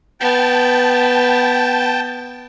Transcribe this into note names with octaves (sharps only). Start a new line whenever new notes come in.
B3 G5 A5